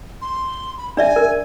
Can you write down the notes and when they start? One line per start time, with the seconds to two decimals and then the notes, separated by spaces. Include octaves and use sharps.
0.22 C6
0.78 B5
0.97 D4 D5 E5 G#5
1.16 A#4